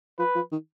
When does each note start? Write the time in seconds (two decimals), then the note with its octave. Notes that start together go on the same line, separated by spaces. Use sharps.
0.19 F3 B4
0.35 F3
0.52 D#3